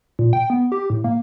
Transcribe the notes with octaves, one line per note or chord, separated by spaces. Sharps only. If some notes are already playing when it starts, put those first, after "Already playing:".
A#2
G5
B3
G4
A2
A#3